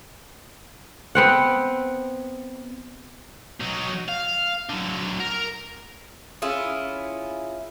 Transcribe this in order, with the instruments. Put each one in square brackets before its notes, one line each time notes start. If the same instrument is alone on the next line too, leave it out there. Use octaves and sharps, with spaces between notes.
[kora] B3 C4 F#5
[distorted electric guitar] F#3 D#4
F5
D3 F#3
A#4
[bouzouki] C#4 E4 F4 G#4